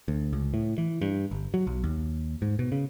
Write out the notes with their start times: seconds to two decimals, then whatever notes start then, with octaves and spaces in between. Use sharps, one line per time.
0.08 D2
0.33 C#2
0.54 A2
0.78 E3
1.01 G2
1.31 G1
1.54 F#3
1.67 B1
1.84 D#2
2.42 G#2
2.59 B2
2.72 C#3